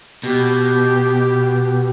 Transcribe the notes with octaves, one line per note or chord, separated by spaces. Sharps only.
B2 G4